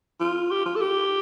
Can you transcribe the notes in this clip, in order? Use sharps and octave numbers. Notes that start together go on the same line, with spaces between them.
F4
G4
F4
A4
G4